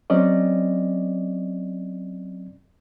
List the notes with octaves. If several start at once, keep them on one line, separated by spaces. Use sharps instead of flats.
F#3 C4 C#4 D5 D#5